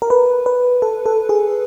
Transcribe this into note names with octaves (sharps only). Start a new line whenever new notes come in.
A#4
B4
B4
A4
A4
G#4